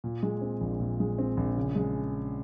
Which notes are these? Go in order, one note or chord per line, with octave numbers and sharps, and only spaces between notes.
A#2
G#3
C4
A#1
A#2
G#3
C4
A#1
C#3
G#3